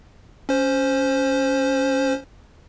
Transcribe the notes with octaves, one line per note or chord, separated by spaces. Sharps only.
C#4 C5